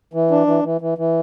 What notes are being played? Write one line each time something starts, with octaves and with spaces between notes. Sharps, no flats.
E3
D4
E3
E3
E3
E3